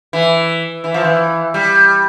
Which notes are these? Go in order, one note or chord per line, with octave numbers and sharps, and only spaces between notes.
E3
E3
F3
E3
G3